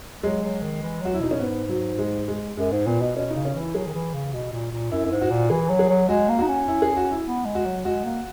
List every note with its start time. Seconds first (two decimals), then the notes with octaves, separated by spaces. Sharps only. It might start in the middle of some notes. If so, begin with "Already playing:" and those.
0.23 F#3 G#3
0.43 F#3
0.62 D#3
0.82 E3
1.01 F#3 F#4
1.14 E4
1.21 B2 D#4
1.31 C#4
1.40 G#2 B3
1.69 F#3
1.98 G#3
2.28 G#3
2.57 F#2 G#3
2.72 G#2
2.87 A#2 B3
3.02 B2
3.16 B2 C#4
3.30 D#4
3.35 C#3
3.45 C#4
3.55 E3
3.60 E4
3.74 F#3 G#4
3.86 D#3
3.94 E3
4.14 C#3
4.33 B2
4.53 A#2
4.72 A#2
4.92 F#2 E4
5.05 F#2
5.11 G#2
5.21 F#4
5.31 A#2
5.50 E3 G#4
5.69 F#3
5.79 G#4
5.89 F#3
6.09 G#3 F#4
6.29 A#3
6.38 D#4 F#4
6.48 C#4
6.68 E4
6.82 G#4
6.96 F#4
7.11 E4
7.26 B3
7.45 G#3
7.55 F#4
7.65 F#3
7.85 G#3 F#4
8.04 A#3